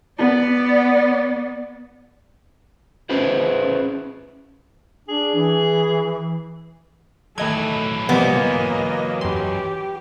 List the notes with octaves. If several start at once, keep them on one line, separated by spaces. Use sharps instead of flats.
B3 D5
C#4 E4 G#4 B4 C5
D4 G#4
E3
D#3 E3 F#3 A3 D#5 G#6
C3 F3 G3 A#3 B3 D#5
F#2 G4 C6